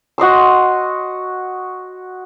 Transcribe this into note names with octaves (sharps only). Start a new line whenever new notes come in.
F#4 D#5 C6 E6